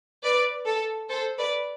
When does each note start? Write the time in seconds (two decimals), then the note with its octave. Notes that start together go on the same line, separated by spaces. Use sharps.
0.23 B4 D5
0.66 A4
1.09 A4 C5
1.38 B4 D5